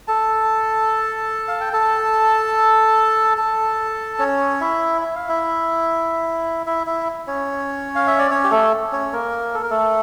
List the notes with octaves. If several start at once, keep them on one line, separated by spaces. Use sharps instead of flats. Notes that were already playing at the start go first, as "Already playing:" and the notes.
A4 A5
F5
G5
A4 A5
A4 A5
C#4 C#5
E4 E5
E5
F5
E4 E5
E4 E5
E4 E5
C#4 C#5
F5
E5
D5
C#4 C#5
G4
A3 A4
C#4 C#5
A#3 A#4
A4
A#4
A3 A4